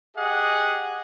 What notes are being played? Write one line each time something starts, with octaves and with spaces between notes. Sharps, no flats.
G4 G#4 D#5 F#5